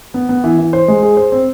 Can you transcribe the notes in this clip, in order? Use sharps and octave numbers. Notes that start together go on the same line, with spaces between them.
B3
B3
E3
E3
C5
G#3
G#4
C5
C4